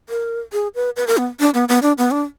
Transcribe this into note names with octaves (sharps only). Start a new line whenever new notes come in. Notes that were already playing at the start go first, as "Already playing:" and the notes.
A#4
G#4
B4
B4
A#4
B3
D4
B3
B3
D4
B3
D4